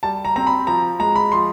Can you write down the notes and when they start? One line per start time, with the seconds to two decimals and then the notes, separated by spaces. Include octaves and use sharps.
0.03 G3 A5
0.25 A#5
0.36 C4 A#5
0.47 B5
0.67 F3 A#5
1.00 G#3 A#5
1.16 B5
1.32 F3 C6